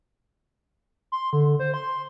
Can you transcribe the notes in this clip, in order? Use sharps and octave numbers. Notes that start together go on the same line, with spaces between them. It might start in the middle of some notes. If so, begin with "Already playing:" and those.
C6
D3
C5
C6